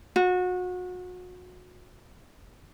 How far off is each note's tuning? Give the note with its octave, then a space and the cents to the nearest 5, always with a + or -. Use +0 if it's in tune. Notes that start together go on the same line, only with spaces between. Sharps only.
F#4 -30